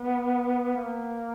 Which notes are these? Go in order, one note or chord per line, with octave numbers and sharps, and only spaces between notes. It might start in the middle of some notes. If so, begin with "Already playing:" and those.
Already playing: B3
A#3